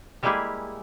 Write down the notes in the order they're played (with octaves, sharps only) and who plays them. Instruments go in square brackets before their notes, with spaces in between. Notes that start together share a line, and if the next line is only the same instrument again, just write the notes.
[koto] G3 G#3 A#3 E4 G4 G#4